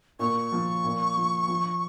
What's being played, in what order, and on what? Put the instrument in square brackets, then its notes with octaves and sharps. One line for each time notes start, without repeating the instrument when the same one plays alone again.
[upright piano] A#2 [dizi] C#6
[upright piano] F3
A#2
F3
F3